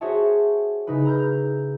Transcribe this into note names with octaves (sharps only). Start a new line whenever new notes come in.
F#4 G#4 C5 C#5 E5 A5
C#3 D#4 E4 B4
A#5 B5 E6 F6 G6